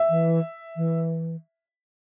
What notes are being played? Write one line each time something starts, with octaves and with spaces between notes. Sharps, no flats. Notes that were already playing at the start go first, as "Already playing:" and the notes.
Already playing: E5
E3
E3